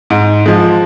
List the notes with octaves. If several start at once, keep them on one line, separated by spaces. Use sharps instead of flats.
G#2
F3 G#3